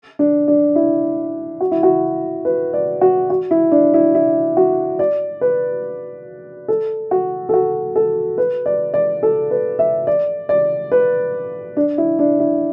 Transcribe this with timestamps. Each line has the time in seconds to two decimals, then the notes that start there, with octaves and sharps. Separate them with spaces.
0.19 D4
0.48 D4
0.76 E4
1.61 F#4
1.71 E4
1.83 F#4
2.45 B4
2.74 D5
3.01 F#4
3.30 F#4
3.51 E4
3.72 D4
3.94 E4
4.15 E4
4.57 F#4
4.99 D5
5.41 B4
6.68 A4
7.11 F#4
7.49 A4
7.54 F#4
7.96 A4
8.38 B4
8.66 D5
8.94 D5
9.23 A4
9.51 B4
9.79 E5
10.07 D5
10.49 D5
10.92 B4
11.77 D4
11.98 E4
12.19 D4
12.40 E4